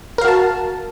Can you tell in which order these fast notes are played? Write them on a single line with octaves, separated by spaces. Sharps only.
A#4 F5 F#4 A5